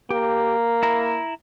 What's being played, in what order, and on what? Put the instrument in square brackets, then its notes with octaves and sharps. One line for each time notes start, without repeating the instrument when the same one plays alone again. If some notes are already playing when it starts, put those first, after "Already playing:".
[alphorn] A#3 [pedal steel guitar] G4
[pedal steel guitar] E4 A#5